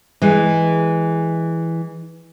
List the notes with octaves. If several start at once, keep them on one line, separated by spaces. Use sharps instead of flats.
E3 G#3